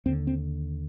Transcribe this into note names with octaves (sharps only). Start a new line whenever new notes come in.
D#2 D3 C4
C4